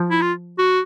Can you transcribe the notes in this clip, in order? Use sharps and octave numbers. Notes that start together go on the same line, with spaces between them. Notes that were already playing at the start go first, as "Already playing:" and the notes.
Already playing: F3
E4
F4
F#4